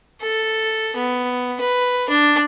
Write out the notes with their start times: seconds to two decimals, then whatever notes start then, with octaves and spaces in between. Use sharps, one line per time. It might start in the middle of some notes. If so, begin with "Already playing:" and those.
0.22 A4
0.96 B3
1.60 B4
2.09 D4